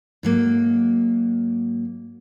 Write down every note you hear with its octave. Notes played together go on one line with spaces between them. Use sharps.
G#2 F#3 A#3